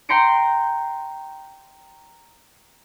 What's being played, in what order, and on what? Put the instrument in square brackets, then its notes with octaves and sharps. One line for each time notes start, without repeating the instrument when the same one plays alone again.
[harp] G5 A#5 C6 A#6 C#7 D7